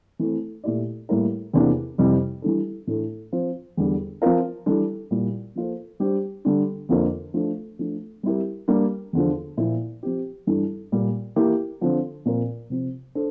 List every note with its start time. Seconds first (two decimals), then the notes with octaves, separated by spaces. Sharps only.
0.19 E3 A3 C4
0.64 A#2 A3 E4 G4 D5
1.09 A2 G3 A#3 E4 A#4
1.53 E2 C3 E3 A#3 D4
1.98 F2 C3 E3 G3
2.42 E3 G3 D4 A4
2.87 A2 E3 A3 D4 A4
3.33 F3 C4 F4 C5
3.77 E2 D3 G3
4.22 F3 C4 F4 A#4
4.66 E3 G3 D4 A4
5.11 A#2 G3 A#3 E4
5.55 F3 A#3 F4 A4 C5
6.00 G3 D4 G4 C5
6.45 D3 G3 D4
6.89 F2 D3 F3 A#3 F4
7.34 F3 A3 D4
7.79 F3 A3 D4
8.23 G3 C4 E4 G4 A#4
8.68 G3 A#3 D4
9.13 E2 D3 F3
9.57 A#2 F3 A#3 E4
10.03 F3 C4 G4
10.47 G2 E3 G3 D4 A4
10.92 A#2 G3 A#3
11.36 E3 A#3 E4 G4
11.81 D3 F3 C4
12.25 A#2 F3 C4 F4 A#4
12.70 C3 F3 C4
13.15 D4 A4 C5